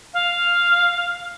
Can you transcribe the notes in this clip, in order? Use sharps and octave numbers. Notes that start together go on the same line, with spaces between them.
F5